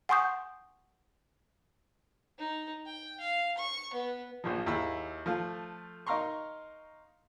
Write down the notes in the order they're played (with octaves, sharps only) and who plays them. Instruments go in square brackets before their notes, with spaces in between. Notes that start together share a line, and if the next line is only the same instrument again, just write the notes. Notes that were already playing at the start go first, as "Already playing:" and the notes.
[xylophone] F#5 G#5 C6 C#6 D#6 G6
[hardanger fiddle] D#4
G5
F5
C#6
B3
[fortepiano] A#1 A#2 F3
D#2 E4 G#4 E6
F3 A3 F5
D#4 A#4 F5 A#5 C6 C#6